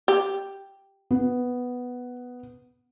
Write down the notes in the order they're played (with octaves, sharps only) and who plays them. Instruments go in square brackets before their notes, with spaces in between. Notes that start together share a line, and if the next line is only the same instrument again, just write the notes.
[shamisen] G4
[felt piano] B3